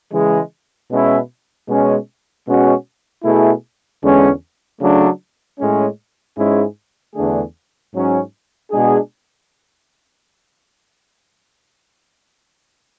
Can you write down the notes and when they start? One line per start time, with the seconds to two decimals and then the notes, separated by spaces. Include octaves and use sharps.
0.12 C#3 E3 G#3
0.91 B2 G#3 C#4 E4
1.68 B2 G#3 C#4
2.46 B2 G#3 C#4 F#4
3.24 B2 A3 E4 G#4
4.02 E2 D3 G#3 C#4
4.80 C#3 F#3 A3 D4
5.58 A2 G#3 C#4
6.36 G#2 G#3 C#4 E4 G#4
7.14 E2 D3 A3 D4 G#4
7.93 G#2 F#3 C#4
8.70 B2 G#3 D4 G#4